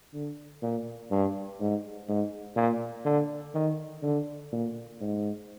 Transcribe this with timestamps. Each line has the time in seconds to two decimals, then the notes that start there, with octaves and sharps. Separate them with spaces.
0.14 D3
0.62 A#2
1.11 G2
1.60 G#2
2.08 G#2
2.57 A#2
3.05 D3
3.54 D#3
4.03 D3
4.52 A#2
5.01 G#2